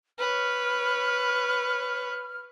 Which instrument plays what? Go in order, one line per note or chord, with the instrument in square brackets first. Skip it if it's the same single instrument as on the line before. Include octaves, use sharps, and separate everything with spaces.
[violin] B4 C#5 [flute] F6